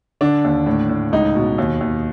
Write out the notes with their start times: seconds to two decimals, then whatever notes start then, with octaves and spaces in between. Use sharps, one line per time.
0.21 D3 D4
0.45 D#2
0.66 A2
0.89 A2
1.12 C#2 D#4
1.35 B2
1.58 D#2
1.81 D#2